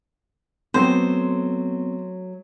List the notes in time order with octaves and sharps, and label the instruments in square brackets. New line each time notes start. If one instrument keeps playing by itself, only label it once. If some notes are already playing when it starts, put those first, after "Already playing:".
[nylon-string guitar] F#3 A3 [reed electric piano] B3 C4 [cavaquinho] C5